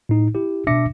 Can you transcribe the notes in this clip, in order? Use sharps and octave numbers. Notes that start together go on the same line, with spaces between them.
A2 D#4
E4 G4
B2 D4 E5 D6 A#6 C#7